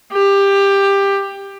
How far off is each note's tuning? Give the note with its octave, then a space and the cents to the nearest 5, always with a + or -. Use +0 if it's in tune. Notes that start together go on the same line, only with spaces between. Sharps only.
G4 +15